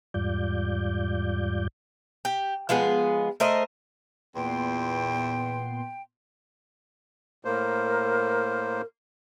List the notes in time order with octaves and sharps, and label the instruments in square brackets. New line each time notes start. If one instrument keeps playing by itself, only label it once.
[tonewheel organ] E2 G#2 G3 F4 D5 G6
[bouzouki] G4
F3 G#3 B3 G#4
A3 A#4 C5 D#5
[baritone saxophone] E2 [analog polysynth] A#2 B3 C6 [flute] G5
[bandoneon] A2 A#3 C5 [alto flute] A#4